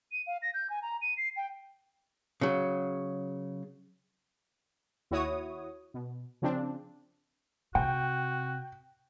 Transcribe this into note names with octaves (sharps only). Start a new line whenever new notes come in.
D#7
F5
A#6
G6
G#5
A#5
D#7
C7
G5
C#3 F#3
D#2 E4 F#4 C#5 D#6
B2
C#3 F3 C4 D4
C3 F#4 G5